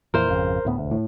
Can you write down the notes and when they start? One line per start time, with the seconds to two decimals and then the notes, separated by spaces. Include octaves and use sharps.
0.14 F2 A#2 E3 A#4 C5
0.30 G#1 F2 C#3
0.65 D2 A2 B3
0.78 E1 D2
0.91 A2